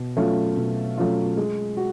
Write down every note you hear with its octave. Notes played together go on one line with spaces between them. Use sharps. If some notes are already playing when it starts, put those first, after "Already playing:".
Already playing: B2
F#3 A3 C#4 F4
B2
F#3 A3 C#4 F4
G#3
F#4